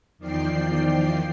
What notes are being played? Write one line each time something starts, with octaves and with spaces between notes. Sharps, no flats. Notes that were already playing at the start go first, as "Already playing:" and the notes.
E2 D#3 F3 D5 G5 C7